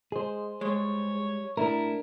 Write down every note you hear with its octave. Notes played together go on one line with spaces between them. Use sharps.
G#3 G#4 C5
G3 G#3 C#5
A2 D4 E4 A#4